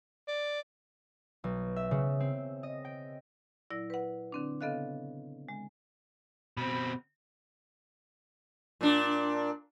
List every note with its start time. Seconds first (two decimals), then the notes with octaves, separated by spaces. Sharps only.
0.28 D5
1.44 B1
1.76 E5
1.91 C#3
2.20 C4
2.63 D#5
2.85 G5
3.70 A#2 F#3 E4 D5 A#6
3.90 B4 F#5
4.32 D3 C4 D4
4.61 C#3 B3 A4 D#5 F5 F#6
5.49 G#3
6.57 B2 C4 B5
8.81 A#2 D4